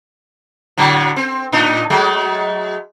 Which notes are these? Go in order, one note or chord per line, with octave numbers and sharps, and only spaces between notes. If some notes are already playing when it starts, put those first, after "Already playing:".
A2 D3 F#3
C4
A2 D4 D#4
F#3 G#3 A3